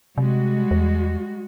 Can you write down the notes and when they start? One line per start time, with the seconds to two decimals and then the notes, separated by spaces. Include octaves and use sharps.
0.18 C3 G3 G#3 F#4
0.71 E2